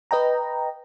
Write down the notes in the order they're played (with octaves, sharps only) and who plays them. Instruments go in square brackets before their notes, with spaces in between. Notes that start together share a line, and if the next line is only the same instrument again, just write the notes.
[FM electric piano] B4 D#5 G5 A#5